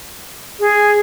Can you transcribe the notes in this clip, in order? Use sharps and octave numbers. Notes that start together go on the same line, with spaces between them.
G#4